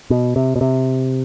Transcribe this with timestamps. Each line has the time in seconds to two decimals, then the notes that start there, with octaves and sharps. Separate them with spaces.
0.10 B2
0.36 C3
0.56 B2
0.61 C3